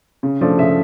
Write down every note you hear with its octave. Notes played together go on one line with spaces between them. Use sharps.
C#3
F3 A3 D4
C#3 E5